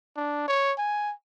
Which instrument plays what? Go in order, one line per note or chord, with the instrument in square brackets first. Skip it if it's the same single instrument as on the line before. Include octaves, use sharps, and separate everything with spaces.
[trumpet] D4
C#5
G#5